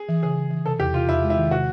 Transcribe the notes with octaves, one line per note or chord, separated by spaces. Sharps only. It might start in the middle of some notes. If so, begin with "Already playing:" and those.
Already playing: G#4
E3
C#3 G#4
C#3
E3
C3 A4
E2 G4
C3 F4
E2 E4
G#3
E4
D#3
C3 F#4